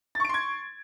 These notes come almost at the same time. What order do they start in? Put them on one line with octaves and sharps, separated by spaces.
A6 C#6 D7 C6 G#6